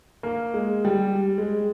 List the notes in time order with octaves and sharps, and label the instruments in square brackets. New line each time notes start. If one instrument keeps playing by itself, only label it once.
[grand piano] A#3
G#3
G3
G#3